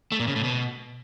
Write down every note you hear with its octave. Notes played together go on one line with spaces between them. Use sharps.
A3
A#2
C#3
A2
B2